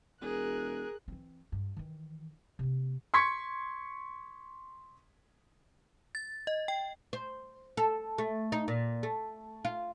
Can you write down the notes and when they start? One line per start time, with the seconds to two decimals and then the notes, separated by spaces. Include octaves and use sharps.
0.22 E1 G#4 A#4 F#6
1.08 E3 C4
1.52 G2
1.77 D#3 E3
2.59 C3 A#3
3.14 C6 C#6 G#6 B6 C#7
6.15 A6
6.47 D#5
6.68 G5
7.13 C5
7.77 A4
8.18 A3
8.52 D#4
8.68 A#2
9.03 A3
9.65 F4